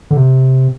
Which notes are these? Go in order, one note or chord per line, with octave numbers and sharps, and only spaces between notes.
D3
C3